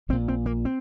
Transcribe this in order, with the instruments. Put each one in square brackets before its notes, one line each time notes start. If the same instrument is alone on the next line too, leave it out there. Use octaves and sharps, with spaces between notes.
[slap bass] A#1 A#2 C4
C4
A#3
C4